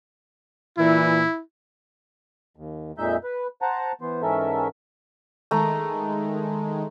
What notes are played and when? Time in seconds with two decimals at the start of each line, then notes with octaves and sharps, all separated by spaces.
0.78 A#2 E3 E4
2.56 D#2
2.98 F2 A#2 G#3 D#4 E5 G6
3.24 B4
3.62 C5 F#5 A5 A#5
4.01 E3 B3 C5
4.22 G#2 E3 C#4 A4 A#4 E5
5.51 D#3 G#3 A3 A#5